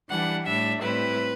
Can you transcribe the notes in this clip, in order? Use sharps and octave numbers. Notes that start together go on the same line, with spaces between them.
E3 G3 D4 F#5
A2 G3 D4 E5
A2 G3 C4 E4 B4